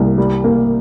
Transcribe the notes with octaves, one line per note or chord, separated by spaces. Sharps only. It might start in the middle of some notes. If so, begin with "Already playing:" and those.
Already playing: C2 A#3
G3
A#3